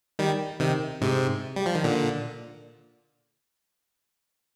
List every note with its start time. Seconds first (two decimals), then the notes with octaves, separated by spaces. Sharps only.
0.19 D#3 G3
0.60 C3 D#3
1.01 G#2 C3
1.56 G3
1.66 F3
1.75 D#3
1.84 A#2 D3